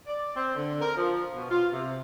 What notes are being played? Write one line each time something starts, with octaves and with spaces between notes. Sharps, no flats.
D5
C4
D3
A#4
F3
B2
F4
C3